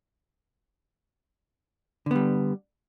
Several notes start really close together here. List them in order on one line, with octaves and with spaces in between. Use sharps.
D3 B3 G3